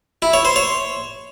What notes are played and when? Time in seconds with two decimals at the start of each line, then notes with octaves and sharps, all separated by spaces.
0.22 E4
0.34 C#5
0.45 C5
0.56 C#5